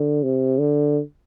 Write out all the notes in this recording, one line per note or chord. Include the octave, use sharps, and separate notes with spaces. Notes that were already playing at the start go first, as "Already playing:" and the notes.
Already playing: D3
C3
D3